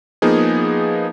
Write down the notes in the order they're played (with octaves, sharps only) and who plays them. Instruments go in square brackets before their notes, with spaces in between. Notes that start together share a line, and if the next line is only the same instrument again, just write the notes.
[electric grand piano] F3 A#3 B3 D#4 G#4